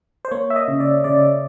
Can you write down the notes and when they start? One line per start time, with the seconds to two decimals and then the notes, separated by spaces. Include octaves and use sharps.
0.25 C5
0.31 A#3 C#5
0.50 E5
0.56 D#5
0.68 C#3
0.80 D5
1.04 C#3 D5